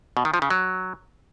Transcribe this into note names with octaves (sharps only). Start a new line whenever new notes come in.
B2
D#3
F3
C#3
F#3